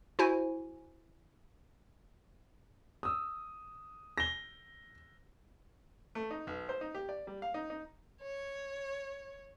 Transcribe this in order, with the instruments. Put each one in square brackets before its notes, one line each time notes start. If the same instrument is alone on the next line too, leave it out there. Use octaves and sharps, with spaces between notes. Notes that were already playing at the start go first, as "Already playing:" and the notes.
[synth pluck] E4 F#4 C5 G#5
[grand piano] D#6 E6
A#6 G7
[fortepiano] A3
D#4
B1
C5
D#4
G4
D5
G3
F5
D#4
D#4
[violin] C#5